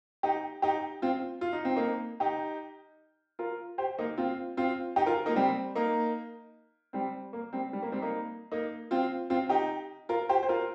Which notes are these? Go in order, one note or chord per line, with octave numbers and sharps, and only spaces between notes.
D#4 G4
D#4 G4
C4 F4
F4
D#4
C4
A#3 D#4
D#4 G4
F4 A#4
G4 C5
A#3 D#4
C4 F4
C4 F4
D#4 G4
F4 A#4
A#3 D#4
G3 C4
A#3 D#4
G3 C4
A#3
G3 C4
G3
A#3
G3 C4
A#3 D#4
A#3 D#4
C4 F4
C4 F4
D#4 G4
F4 A#4
G4 C5
C5
F4 A#4